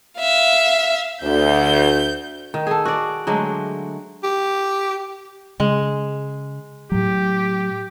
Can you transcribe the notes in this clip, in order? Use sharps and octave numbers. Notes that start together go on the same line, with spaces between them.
E5 F5
D2 G6
D#3
G#4 A4
F#4 D5
D3 F#3 G#3 A3
G4
C#3 G#3
A2 F#3 G4